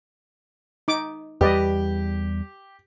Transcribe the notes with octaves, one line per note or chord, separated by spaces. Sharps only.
D#4 D6
E2 G3 G4 B4 D5 D#5